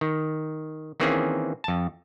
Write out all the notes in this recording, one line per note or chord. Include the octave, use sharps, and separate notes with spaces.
D#3
D#3 E3 A#3 C4 C#4 G#4
F2 A5